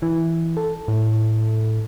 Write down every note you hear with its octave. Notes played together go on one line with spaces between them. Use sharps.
E3
A4
A2